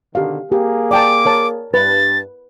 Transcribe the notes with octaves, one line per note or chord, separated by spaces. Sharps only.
B2 D3 D#3 G4 F5
A#3 G4 G#4
D5 G5 A5 D6
A#4 C#5 A5
G2 B4 A6